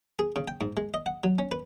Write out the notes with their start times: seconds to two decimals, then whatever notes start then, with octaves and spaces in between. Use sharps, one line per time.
0.19 G#4
0.36 C#3
0.48 G5
0.61 G#2
0.77 G#3
0.94 D#5
1.06 F#5
1.24 F#3
1.39 C#4
1.52 B4